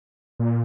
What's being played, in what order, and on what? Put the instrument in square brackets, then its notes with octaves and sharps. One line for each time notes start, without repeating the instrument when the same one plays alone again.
[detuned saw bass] A#2